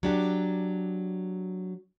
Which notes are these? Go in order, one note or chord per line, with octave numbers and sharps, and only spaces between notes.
F#3 D4 G4